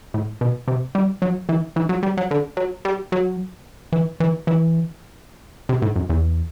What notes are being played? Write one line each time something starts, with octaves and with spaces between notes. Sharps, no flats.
A2
B2
C3
G3
F#3
E3
E3
F#3
G3
F#3
D3
F#3
G3
F#3
E3
E3
E3
C3
A2
F#2
E2